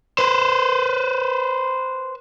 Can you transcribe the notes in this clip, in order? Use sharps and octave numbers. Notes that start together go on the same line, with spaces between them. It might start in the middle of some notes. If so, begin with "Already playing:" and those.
B4 C5